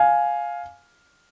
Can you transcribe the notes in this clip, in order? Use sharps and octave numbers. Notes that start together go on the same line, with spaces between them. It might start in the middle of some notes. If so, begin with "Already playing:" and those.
Already playing: F5 G#5